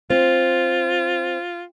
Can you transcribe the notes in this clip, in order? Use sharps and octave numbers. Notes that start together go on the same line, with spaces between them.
C4 F4